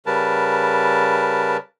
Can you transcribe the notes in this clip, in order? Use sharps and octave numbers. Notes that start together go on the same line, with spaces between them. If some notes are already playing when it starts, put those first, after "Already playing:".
C#3 G3 A#4 B4 A5